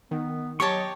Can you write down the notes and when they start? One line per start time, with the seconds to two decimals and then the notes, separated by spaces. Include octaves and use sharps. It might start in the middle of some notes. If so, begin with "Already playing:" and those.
0.11 D#3 B3
0.60 F#3 G4 C#5 D#5 A5 C#6